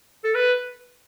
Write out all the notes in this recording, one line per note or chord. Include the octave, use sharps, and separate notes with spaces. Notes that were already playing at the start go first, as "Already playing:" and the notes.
A4
B4